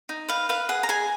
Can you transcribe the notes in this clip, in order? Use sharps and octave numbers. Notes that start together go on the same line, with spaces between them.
D#4
B4 F5
B4 F5
G#4 F#5
A#5
G#4 G#5